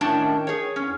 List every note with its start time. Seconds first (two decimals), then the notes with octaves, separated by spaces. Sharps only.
0.01 A2 D#3 C#4 D4 G5 A5
0.47 G#4 C#5
0.76 E2 C#4